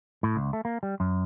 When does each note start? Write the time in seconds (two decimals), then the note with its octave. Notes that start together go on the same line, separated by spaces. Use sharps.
0.23 A2
0.36 C#2
0.53 A3
0.65 A#3
0.83 G3
1.00 F#2